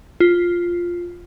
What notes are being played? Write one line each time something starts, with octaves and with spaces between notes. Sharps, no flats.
F4